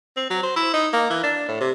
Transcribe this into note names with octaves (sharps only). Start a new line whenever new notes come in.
C4
F#3
C5
E4
D#4
A#3
E3
D4
A2
C3